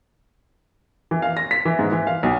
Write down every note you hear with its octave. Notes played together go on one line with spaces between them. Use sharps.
E3
F5
A#6
B6
E3
G#2
E3
F5
B1